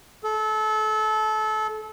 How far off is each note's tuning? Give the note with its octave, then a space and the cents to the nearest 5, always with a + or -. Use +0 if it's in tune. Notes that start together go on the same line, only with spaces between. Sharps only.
A4 -25